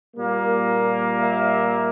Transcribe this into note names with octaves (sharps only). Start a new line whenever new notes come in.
A#2 G3 A#3
E5